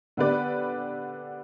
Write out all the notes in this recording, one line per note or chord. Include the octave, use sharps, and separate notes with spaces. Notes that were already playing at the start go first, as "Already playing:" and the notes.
D3 B3 G4 B4 D5